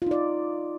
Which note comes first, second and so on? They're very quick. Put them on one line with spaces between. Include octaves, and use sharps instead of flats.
F4 D#4 D5